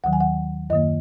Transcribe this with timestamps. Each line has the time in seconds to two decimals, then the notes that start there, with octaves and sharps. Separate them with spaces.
0.04 D#2 D#3 F#3 F#5
0.13 G#5
0.21 F#5
0.70 F#2 D#3 A#3 D#5